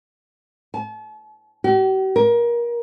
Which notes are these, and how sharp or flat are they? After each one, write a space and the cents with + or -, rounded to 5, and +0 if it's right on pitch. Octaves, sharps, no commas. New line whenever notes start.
A5 -40
G4 -45
A#4 +25